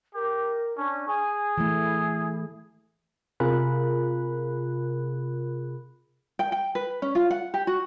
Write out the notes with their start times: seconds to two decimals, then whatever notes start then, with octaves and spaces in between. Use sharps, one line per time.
0.14 G4 A#4
0.77 C#4 D4
1.08 G#4 G#5
1.58 E3 A3 E4
3.40 C3 F4 G#4 A#4 B5 F#6
6.39 G5
6.52 G5
6.75 B4
7.02 C#4
7.15 F4
7.30 F#5
7.54 G4
7.67 F#4